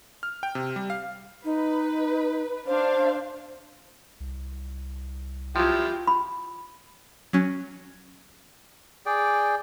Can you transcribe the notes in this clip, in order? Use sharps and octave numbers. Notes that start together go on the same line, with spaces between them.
F6
G5
C3
G3
F5
D#4 B4
D4 C5 F5
C2
F3 F#3 E4 F4 G4
B5
F#3 C#4
G#4 D5 G5